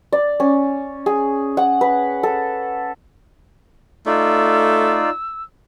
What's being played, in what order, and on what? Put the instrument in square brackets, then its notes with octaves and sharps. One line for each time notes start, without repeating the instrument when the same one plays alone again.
[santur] D5
C#4
G#4
F#5
B4
A4
[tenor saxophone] A3 [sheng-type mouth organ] D#4 F4 D5 [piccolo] E6